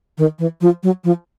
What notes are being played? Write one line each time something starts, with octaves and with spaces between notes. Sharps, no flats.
D#3
E3
F3
F#3
F3